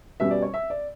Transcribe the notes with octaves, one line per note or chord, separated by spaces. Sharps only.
B2 G3 C#4 E5
D5
C#5
E5
D5